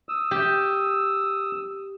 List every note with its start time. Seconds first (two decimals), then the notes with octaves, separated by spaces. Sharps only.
0.09 D#6 E6
0.31 G4